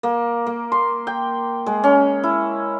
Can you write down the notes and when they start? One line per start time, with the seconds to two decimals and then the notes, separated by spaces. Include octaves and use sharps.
0.03 A#3
0.47 A#3
0.72 C6
1.07 G5
1.66 G#3
1.84 C#4
2.24 E4